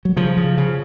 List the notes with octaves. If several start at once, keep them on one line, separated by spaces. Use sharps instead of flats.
F#3
C#3 F3
C#3
C#3